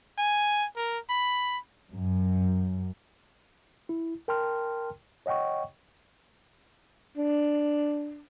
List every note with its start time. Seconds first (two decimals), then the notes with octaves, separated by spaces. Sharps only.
0.18 G#5
0.77 A#4
1.10 B5
1.92 F#2
3.89 E4
4.28 A#4 G5 A5 C6 F6
5.26 C#5 D#5 F#5 G5 C#6
7.17 D4